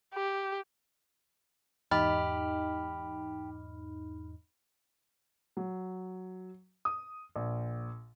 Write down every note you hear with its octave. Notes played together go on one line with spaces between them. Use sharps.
G4
E2 G#2 D#4 G4 D#5 B5 F6
F#3
D#6
A#1